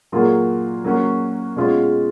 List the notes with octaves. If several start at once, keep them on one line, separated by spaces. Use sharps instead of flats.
A#2 F#3 A#3 F4 G#4
F#3 A#3 C#4 F#4
B2 G#3 C#4 F4 G#4